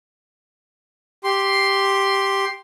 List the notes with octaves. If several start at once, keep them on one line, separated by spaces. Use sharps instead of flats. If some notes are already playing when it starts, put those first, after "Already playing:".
G4 C6